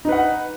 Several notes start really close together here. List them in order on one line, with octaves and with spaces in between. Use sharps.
D#4 B4 F#5